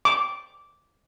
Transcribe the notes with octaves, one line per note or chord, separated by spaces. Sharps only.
D6